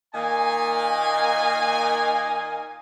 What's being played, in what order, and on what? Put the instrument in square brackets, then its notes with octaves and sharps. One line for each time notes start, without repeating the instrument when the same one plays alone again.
[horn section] A#2 D#3 A#3 D#5 G#5